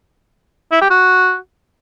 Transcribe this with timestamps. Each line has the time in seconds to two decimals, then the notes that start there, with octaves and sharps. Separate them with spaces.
0.72 E4
0.81 G4
0.90 F#4